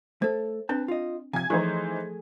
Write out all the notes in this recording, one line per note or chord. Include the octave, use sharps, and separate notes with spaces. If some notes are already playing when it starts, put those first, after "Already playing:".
A3 A4 C5
C4 D4 B4 A5
F4 D#5
C3 F3 G#5 G#6
E3 F3 A3 D#4 G#4 C5